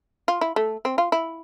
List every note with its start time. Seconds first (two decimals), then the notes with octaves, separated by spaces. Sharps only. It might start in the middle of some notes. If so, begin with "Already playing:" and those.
0.28 F4
0.41 E4
0.56 A3
0.85 C4
0.98 F4
1.12 E4